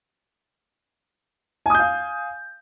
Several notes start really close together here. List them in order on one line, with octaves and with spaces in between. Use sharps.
G#5 D#6 G6 F5